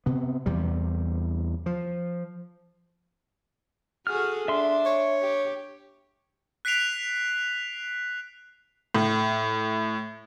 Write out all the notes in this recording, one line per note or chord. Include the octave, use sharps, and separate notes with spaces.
C3 B3
E2 C3 G3
F3
F#4 G#4 A4 F6
D4 E5 C6
C#5
G4
F#6 B6 C7 D7 F7
A2